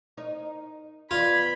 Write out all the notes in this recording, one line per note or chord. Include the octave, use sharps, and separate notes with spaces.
D#4 A#4 C#5
B3 F4 D5 B5 G#6